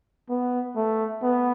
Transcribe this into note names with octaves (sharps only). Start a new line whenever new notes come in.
B3
A3
B3